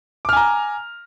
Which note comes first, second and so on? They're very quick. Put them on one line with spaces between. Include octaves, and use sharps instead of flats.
D6 F6 G#5 A#5